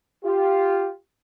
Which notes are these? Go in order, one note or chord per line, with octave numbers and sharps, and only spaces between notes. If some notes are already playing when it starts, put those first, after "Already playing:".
F4 G4